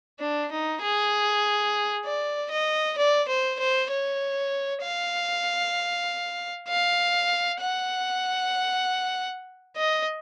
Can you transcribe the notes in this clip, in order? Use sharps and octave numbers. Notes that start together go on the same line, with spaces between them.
D4
D#4
G#4
D5
D#5
D5
C5
C5
C#5
F5
F5
F#5
D#5